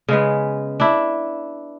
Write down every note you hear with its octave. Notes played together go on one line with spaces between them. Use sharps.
C#3 G#3 B3
D4 E4